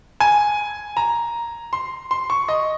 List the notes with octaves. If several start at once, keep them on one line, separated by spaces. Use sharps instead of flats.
G#5
A#5
C6
C6
C#6
D#5